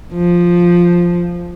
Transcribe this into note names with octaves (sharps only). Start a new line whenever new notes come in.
F3